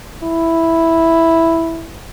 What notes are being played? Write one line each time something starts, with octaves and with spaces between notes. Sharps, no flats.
E4